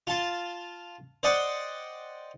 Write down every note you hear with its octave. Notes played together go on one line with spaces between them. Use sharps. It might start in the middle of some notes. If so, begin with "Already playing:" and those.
F4 A5 C6
C5 D5 D#5 F#5 G5 C6